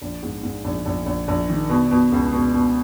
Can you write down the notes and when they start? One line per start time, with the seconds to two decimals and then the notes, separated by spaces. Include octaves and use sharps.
0.02 A#1
0.23 G#2
0.43 G#2
0.64 A#1
0.85 A#1
1.06 A#1
1.28 A#1
1.49 D#3
1.69 B2
1.91 B2
2.12 C#2
2.33 B2
2.54 B2